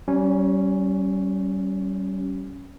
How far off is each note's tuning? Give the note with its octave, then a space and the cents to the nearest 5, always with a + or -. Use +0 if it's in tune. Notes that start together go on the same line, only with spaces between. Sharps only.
G3 -35 C#4 +0